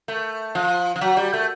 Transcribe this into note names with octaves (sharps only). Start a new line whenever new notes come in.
A3
F3
F3
F#3
G3
A3